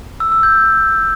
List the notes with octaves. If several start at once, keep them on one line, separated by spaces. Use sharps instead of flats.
E6
E6
G6